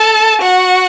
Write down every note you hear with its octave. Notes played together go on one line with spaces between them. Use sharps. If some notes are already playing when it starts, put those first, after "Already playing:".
Already playing: A4 A5
F#4 F#5